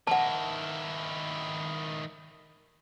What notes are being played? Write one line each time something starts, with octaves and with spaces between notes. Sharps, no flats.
D#3 E4 F#5 A5